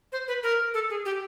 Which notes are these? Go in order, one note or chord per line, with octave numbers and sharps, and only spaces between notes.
C5
B4
A#4
A4
G#4
G4